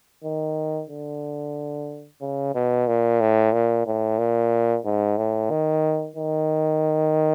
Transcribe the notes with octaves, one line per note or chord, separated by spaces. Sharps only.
D#3
D3
C#3
B2
A#2
A2
A#2
A2
A#2
G#2
A2
D#3
D#3